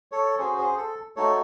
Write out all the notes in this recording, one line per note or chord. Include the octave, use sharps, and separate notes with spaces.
A4 C#5
C#4 F#4 G#4 C5
G#4 C5
A4
A3 D#4 F#4 A4 C#5